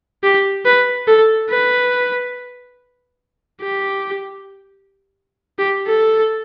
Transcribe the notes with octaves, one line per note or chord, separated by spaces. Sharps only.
G4
B4
A4
B4
G4
G4
A4